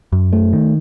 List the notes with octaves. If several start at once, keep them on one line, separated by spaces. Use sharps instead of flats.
F#2
A3
D#3